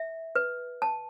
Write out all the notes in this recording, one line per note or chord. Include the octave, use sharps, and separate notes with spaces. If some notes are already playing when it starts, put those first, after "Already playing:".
Already playing: E5
B4
A5